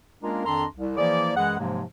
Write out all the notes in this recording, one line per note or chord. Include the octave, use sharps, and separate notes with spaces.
G#3 A#3 C#4 D4 F4 A#4
F2 D#3 D4 A4 A#5 C6
C2
E3 F3 A#3 E4 G#4 D5
F#2 E3 G#3 G#4 F#5
G#2 C3 F3 F#3 G#3 A#3